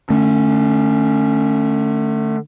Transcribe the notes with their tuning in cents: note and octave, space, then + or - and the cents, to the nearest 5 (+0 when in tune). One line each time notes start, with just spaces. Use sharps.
D3 +35 A3 +0 C#4 +0